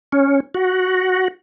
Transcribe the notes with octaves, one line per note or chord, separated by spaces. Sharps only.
C#4
F#4